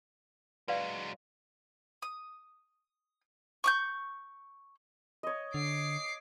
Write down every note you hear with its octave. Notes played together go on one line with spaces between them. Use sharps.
F#3 G#3 B4 D5 F5
D#6
C#6 D6 G6
C#5 D#5
D3 D6 C7